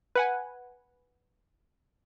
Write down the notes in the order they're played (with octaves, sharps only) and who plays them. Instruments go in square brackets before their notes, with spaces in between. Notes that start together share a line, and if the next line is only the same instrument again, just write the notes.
[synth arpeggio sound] B4 F#5 G#5